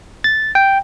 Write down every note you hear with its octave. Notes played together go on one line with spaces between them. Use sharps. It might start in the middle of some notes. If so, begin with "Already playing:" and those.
A6
G5